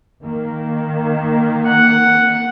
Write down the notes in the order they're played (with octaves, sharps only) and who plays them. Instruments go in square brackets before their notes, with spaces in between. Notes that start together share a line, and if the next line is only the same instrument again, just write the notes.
[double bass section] D#3 A#3
[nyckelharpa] F#5